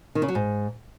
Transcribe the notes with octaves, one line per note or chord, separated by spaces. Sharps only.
D#3
C#3
F#3
G#2